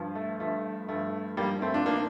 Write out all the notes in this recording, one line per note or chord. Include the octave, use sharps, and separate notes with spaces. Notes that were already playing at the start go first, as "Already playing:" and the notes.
Already playing: G2 F3
A3
G2 F3 A3
G2 F3 A3
G2 F3 G3 A#3
A3 C4
D4 F4
D#3 A#3 D4